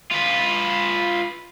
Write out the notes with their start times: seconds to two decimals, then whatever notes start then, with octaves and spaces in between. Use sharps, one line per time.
0.12 F4 B4